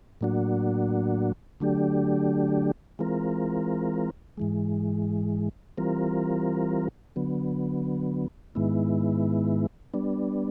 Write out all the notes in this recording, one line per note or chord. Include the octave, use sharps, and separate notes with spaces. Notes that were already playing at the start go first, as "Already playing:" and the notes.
A2 F#3 A#3 D4 F#4
D3 F#3 A3 D4 G4
E3 G#3 C4 F4 A#4
G#2 E3 G#3
E3 G3 C4 F4 A#4
D3 F#3 B3
G#2 D#3 G#3 B3 E4
G3 B3 D4